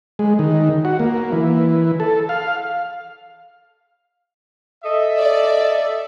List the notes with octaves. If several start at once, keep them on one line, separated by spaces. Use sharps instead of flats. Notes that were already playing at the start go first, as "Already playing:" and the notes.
G#3
D#3
F#4
A#3
E3
A4
F5
A4 D#5 E5
D5